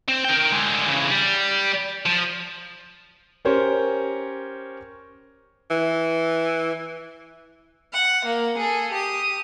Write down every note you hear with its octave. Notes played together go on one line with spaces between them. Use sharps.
C4
A#4 G5
D3 G#3
C#3 E3
G3
F3
C#4 G4 A#4 C5 C#5
E3
F#5
A#3
G#4 A4
G4 D#6